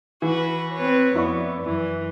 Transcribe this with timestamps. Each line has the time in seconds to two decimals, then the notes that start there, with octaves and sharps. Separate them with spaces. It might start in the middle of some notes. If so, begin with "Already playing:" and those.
0.22 E3 F#4 B4
0.74 C4 B4 C#5
1.16 F2 B3 E4 D5 C#6
1.63 F#2 E3